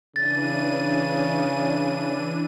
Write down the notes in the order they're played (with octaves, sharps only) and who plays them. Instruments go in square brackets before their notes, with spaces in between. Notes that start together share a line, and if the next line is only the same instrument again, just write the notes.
[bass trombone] C#3 [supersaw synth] E3 D4 D#7 [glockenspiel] A6